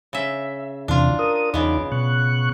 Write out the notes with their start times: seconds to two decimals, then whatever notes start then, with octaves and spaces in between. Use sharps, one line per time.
0.13 C#3 E5
0.88 E2 C3 E3 D4 F4
1.19 A#4 D#6
1.54 E2 C#3 B3 D#4 D6
1.92 B2 C#6 F#6